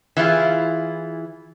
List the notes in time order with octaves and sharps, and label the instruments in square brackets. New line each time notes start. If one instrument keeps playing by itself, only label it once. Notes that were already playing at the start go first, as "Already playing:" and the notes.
[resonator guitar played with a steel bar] E3 E4 F4 G#4